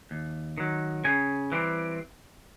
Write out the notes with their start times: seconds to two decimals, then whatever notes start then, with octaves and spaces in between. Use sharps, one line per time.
0.11 D#2
0.58 D#3 F#3
1.05 C#3 G#5
1.52 E3 G3 C4